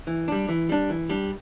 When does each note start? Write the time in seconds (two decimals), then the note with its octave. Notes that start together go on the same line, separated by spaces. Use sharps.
0.07 E3
0.28 G3 D4
0.49 E3
0.69 G3 D4
0.90 E3
1.10 G3 D4